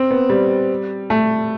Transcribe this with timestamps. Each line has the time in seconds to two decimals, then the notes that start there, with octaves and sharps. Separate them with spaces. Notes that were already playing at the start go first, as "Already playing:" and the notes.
Already playing: C4
0.11 B3
0.30 G3
1.10 A3